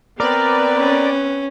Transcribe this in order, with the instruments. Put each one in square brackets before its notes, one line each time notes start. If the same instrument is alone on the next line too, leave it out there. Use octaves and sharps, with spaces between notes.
[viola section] B3 C4 B4 [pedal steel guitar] A#4 [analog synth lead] D5
[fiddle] C#4